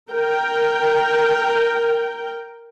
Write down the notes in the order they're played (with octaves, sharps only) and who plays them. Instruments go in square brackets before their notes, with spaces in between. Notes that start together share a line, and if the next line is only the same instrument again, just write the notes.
[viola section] A#4 G5